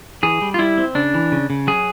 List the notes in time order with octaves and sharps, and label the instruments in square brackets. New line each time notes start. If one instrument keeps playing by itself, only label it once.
[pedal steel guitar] E3 G#4
G3
F4
G3 E4
C4
C#3 D4
E3
C#3
C#3
F#3 G#4